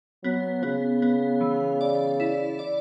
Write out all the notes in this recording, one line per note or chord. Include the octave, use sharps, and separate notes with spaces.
F#3 B3
C#3 B3
B3
E3
D5
E4
D5